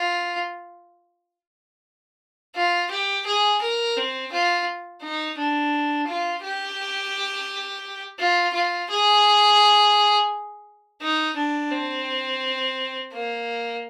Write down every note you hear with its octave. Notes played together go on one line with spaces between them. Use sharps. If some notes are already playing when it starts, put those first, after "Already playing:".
Already playing: F4
F4
G4
G#4
A#4
C4
F4
D#4
D4
F4
G4
F4
F4
G#4
D#4
D4
C4
A#3